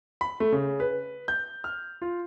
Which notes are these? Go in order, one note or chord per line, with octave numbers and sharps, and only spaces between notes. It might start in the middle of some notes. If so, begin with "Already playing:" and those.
B5
A3
C#3
B4
G6
F6
F4